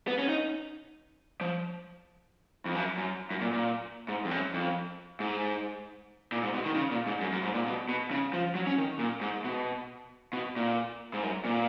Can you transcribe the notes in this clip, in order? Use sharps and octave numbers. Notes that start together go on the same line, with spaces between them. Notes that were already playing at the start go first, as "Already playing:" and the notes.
B3
C#4
D#4
F3
F2
F#2
F#2
F#2
A#2
A#2
G#2
F2
F#2
F2
G#2
A#2
G#2
B2
D#3
C#3
A#2
G#2
F#2
F#2
G#2
A#2
B2
B2
C#3
F3
F#3
C#4
D#3
A#2
G#2
B2
B2
A#2
G#2
F#2
A#2